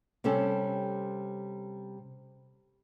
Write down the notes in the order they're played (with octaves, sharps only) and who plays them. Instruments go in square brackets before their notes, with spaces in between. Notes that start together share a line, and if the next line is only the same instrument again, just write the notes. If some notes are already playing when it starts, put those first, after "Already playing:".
[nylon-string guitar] C3 G3 C4 C#4 A4